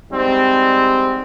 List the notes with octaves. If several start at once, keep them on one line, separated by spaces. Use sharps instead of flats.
G#2 G3 C4